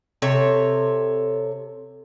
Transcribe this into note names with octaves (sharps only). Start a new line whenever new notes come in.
C3 A4 C#5